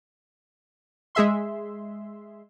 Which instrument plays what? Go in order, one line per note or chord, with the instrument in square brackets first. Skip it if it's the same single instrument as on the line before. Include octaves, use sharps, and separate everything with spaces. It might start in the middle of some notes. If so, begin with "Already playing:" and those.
[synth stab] G#3 G#4 E5 C6